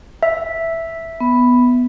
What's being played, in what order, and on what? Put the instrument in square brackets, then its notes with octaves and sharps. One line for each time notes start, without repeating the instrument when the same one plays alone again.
[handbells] E5
[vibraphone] B3